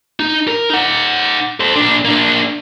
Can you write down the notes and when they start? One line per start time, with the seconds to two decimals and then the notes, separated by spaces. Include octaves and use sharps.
0.20 D#4
0.48 A#4
0.70 D#4 F#5
1.60 A4 C5
1.76 A#2 D4
2.05 A#3 D4